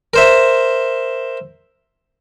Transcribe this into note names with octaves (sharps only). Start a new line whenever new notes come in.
A#4 C5 E5